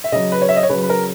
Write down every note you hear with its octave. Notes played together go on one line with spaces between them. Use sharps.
E5
C#3 F#3 D#5
B4
C#5
E5
D#5
C#5
C#3 F#3 B4
B4
A#4